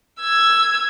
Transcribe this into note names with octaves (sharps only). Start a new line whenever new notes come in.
E6 G#6